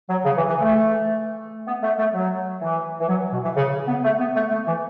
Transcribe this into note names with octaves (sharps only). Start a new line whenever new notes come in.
F#3
C#3
E3
E3
A3
B3
A3
A3
F#3
E3
E3
F#3
B2
E3
C#3
B3
A3
B3
A3
A3
E3